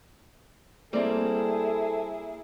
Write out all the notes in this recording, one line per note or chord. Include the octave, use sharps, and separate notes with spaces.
G3 A#3 C4 E4 G#4 A4 D5